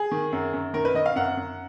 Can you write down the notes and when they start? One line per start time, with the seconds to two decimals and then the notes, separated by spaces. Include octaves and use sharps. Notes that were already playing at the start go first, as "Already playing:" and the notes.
Already playing: G#4
0.11 D#3
0.32 F#2
0.53 F#2
0.74 D#3 A#4
0.85 B4
0.94 D#3 D#5
1.06 F5
1.16 F#2 F#5
1.37 F#2